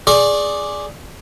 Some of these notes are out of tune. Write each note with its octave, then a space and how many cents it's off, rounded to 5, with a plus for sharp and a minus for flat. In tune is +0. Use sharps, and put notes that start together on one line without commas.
G#4 +0 D5 +0 C#6 -40